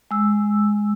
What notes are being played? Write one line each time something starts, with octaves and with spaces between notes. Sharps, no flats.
G#3 E6